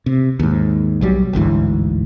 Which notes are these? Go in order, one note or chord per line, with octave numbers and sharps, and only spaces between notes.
C3
D#2 G#2
B1 F#3 G3
G1 D2 G#2 E3